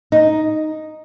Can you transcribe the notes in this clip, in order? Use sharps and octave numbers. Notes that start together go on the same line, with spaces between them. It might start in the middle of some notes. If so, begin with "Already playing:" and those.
D#4